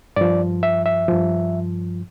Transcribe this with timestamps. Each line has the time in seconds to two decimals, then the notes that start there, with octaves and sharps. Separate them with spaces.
0.16 G2 F3 D5
0.63 E5
0.86 E5
1.08 G2 F3